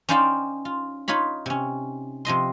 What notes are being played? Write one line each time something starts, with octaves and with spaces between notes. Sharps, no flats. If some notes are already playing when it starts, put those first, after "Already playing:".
C#4 D#4 C5 D5 F5 G5
F4
D#4 F4 C#5 B5
C3 C#4
C3 F3 D#5 C6